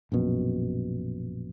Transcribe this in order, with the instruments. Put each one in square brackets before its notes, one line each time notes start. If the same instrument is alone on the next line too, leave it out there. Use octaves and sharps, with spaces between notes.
[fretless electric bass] A#1 F#2 B2